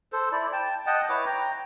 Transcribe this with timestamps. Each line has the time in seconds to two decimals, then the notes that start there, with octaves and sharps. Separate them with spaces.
0.12 A4 C5
0.32 E4 D5
0.53 G5 A5
0.86 D#5 F#5 G5 A5
1.09 E4 B4 C#5 D6
1.26 G5 A#5